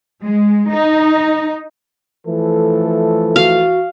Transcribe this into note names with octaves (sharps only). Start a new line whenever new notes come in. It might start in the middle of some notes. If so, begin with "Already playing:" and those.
G#3
D#4
E3 F3 A3 A4
F#4 F5